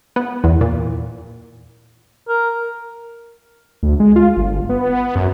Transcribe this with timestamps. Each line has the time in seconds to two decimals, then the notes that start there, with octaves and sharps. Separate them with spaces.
0.16 B3
0.44 E2
0.61 A#2
2.29 A#4
3.83 D2
4.00 G#3
4.16 F4
4.37 G1
4.69 B3
5.15 F#2